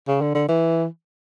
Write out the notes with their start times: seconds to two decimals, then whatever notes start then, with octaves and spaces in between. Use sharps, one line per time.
0.08 C#3
0.21 D3
0.35 D3
0.49 E3